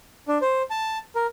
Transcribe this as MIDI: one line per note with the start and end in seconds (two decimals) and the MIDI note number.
0.28 0.38 62
0.41 0.62 72
0.70 0.98 81
1.15 1.27 70